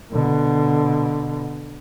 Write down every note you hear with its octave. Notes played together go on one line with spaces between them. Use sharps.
B2 D3